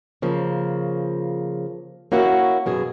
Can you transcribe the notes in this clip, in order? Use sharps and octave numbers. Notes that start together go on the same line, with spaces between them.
C#3 F3 A#3
A#3 C#4 E4 F#4
F#2 B2 G#4